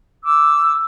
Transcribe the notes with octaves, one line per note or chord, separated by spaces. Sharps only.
D6 E6